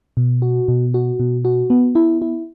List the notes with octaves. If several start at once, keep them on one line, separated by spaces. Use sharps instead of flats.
B2
F#4
B2
F#4
B2
F#4
B3
E4
E4